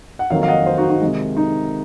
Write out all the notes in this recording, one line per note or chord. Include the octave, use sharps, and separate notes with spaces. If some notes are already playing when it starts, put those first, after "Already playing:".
F#5
F2 D#3 F#3 A#3 C#5 F5
F5
D#5 F#5
C5 D#5
D#4 F#4
D#4 F#4
C3 D#3 G#3
D#4